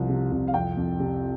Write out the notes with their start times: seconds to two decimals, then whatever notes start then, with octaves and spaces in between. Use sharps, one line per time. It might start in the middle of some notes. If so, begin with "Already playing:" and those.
Already playing: C2 F3
0.09 C3
0.32 C2
0.47 F5
0.54 F2 G5
0.77 F2
0.99 C3